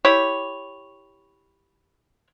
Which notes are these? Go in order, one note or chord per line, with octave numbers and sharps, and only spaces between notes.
E4 G4 C#5